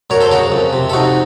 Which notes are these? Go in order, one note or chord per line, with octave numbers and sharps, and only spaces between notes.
F#2 A#4 C#5
A4 C5
C#3 F#4 A#4
F2
C3
A4
F2 D#4 F#4